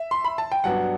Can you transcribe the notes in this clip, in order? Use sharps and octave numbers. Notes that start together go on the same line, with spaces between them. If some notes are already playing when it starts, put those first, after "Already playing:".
Already playing: E5
C6
B5
A5
G5
G2 F#3 B3 D4 F#5